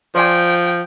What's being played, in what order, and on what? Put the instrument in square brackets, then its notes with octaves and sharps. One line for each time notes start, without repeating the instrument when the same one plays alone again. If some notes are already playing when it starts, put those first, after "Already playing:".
[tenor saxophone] F3 [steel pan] C5 D5 G#5 [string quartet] G5